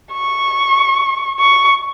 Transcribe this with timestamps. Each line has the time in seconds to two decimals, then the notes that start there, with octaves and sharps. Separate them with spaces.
0.13 C#6
1.40 C#6